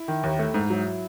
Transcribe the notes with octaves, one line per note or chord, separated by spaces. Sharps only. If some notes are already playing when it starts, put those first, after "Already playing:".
Already playing: E4
D#3
D#2
A3
G#2
F#3